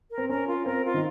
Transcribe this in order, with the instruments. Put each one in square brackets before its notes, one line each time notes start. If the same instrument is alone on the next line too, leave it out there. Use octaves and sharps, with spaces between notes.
[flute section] A#4
[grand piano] C4
[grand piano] C#4 [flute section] A#4
[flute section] F4
[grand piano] C4 [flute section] A#4
[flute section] F4
[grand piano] D#3